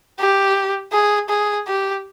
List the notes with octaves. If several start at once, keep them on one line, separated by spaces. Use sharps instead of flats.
G4
G#4
G#4
G4